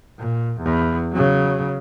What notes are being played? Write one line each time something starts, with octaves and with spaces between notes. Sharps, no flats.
A#2
E2
C#3 F#3